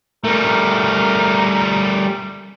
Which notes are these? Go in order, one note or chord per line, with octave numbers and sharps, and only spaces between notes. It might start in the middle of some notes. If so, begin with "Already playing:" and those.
G3 A3 A#4